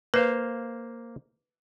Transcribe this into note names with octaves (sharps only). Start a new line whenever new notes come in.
A#3 B4 C5 F5